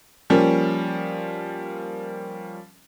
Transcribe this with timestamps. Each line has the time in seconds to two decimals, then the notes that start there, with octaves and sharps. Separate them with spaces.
0.30 F3 G3 A#3 C#4